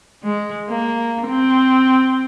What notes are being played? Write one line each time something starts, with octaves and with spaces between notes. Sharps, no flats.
G#3
A#3
C4